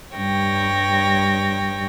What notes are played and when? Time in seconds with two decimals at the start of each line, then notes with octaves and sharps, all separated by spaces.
0.14 G2 G3 C#5 G5 A#6